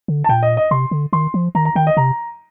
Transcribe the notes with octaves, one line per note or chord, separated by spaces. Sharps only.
D3
A5
A#2 G5
D#5
D#5
C3 C6
D3
D#3 C6
F3
D#3 A#5
A#5
D#3 G5
D#5
C3 A#5